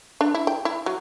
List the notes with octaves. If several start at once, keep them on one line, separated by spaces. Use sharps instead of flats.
D4
E4
G5
E4
F#3